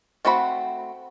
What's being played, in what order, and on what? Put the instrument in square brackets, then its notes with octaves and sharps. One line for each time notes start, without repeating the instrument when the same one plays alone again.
[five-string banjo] A3 C4 F#4 F#5 B5